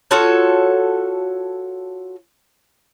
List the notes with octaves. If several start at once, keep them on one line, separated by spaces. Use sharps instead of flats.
F4 F#4 A4 C#5